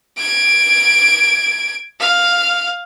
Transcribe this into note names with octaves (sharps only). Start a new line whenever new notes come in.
G#6 D7
F5